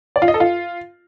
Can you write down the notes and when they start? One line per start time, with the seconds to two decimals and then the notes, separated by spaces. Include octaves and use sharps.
0.16 D5
0.22 F4
0.28 D#5
0.34 A4
0.40 F4